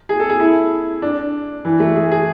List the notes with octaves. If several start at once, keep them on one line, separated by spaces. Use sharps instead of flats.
G#4
A4
G#4
E4
D4
E3
A3
G#4
G#4